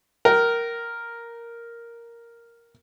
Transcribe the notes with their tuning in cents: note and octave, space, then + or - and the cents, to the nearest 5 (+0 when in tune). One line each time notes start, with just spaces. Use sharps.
A#4 +0 G5 -35